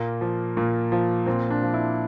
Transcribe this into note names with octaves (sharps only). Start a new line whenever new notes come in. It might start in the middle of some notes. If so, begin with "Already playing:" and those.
Already playing: A#2 A#3
F3
A#2
F3
A#2 C4
D4
F3
E4